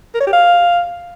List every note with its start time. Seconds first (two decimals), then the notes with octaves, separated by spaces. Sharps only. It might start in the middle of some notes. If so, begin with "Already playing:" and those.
0.14 A#4
0.21 C#5
0.27 G4
0.33 F5